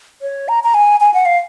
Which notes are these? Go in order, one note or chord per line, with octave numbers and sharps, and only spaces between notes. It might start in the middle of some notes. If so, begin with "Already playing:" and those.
C#5
A#5
A#5
G#5
G#5
F#5
F5